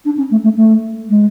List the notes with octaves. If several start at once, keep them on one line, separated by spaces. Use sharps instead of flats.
D4
C#4
A3
A3
A3
G#3